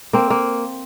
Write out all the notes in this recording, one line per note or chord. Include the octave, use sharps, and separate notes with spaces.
A#3 C4
A#3